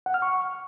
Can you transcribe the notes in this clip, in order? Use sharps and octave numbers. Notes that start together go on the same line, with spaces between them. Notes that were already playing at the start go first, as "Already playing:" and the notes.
F#5
F6
C#6